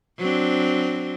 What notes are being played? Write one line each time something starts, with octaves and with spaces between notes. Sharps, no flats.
F#3 C4 D4